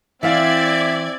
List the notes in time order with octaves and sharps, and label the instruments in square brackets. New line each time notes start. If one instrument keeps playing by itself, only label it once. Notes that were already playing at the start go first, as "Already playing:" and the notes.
[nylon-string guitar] E3 F5 [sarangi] C4 [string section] D5 G#6 [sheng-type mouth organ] E5